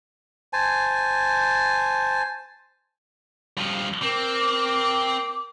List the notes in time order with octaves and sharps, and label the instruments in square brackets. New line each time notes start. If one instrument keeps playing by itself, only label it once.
[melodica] C5 G#5 A5
[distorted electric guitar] G2 F3
[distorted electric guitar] C4 [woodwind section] A#4 D6